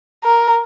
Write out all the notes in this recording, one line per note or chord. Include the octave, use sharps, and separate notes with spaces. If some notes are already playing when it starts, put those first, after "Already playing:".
A#4